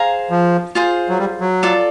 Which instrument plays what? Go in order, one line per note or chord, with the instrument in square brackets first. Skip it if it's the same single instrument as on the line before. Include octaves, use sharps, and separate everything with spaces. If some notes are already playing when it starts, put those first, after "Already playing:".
Already playing: [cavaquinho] G#4 C5 F5 A#5
[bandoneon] F3
[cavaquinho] F4 G#4 C5
[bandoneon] F#3
G3
F#3
[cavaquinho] F4 A4 D5